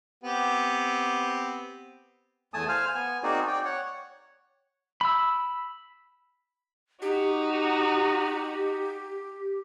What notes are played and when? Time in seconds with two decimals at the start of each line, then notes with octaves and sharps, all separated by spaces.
0.24 B3 C4 G4
2.54 E2 A3 G#5 A5 D#6
2.68 C5 F5 G#5 F6
2.95 B3 G#5
3.23 A#3 C4 D#4 F#4 G#4 D5
3.47 D5 G5
3.65 C#5 F#5
5.01 B5 E6
7.02 D#4 F#4 G4